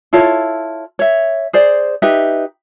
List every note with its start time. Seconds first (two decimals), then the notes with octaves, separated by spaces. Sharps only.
0.13 E4 F4 A4 C#5
0.99 C#5 E5
1.53 G#4 C5 D5
2.02 D#4 G4 B4 E5